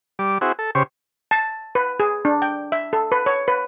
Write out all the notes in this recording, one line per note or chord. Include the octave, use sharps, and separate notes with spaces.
G3 D6
C4 E4 F#4 G#4
A4
C#3 G4 C5 C#6
A5
B4
G#4
D4
G5
E5
A4
B4
C#5
B4